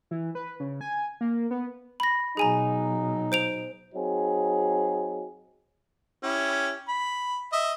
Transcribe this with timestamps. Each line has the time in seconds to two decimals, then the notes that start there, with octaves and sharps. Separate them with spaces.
0.11 E3
0.35 B4
0.60 C#3
0.81 G#5
1.21 A#3
1.51 B3
2.00 B5 A#6
2.37 B2 F#3 D#4 G#4 G#5 A#5
3.32 C5 D7 F7
3.94 F#3 C4 D#4 G#4
6.23 C#4 E4 G4
6.88 B5
7.53 D#5 E5